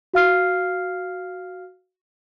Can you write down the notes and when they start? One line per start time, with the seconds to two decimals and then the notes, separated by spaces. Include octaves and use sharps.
0.14 F#4 F5 F6 C7